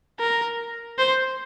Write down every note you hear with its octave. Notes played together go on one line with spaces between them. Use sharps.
A#4
C5